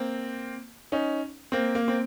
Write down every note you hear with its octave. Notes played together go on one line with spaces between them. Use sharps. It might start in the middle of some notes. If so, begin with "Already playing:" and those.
Already playing: A#3 C4
C#4 D#4
A#3 C4
A#3
C4